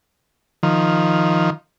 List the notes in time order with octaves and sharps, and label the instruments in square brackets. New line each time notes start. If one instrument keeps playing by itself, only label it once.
[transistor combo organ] D#3 F3